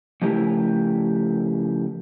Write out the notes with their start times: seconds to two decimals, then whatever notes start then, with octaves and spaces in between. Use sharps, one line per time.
0.22 C#3 F3 A3 E4 G4 A#4